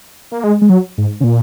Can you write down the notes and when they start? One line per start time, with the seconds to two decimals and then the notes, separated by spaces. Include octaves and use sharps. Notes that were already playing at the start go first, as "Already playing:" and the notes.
0.32 A#3
0.44 G#3
0.62 G#3
0.70 F#3
0.98 G#2
1.21 C#3
1.24 A#2